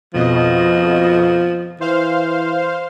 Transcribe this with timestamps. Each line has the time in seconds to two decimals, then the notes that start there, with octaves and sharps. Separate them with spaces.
0.14 F2 B2 F3 D#5
1.81 E3 C5 F5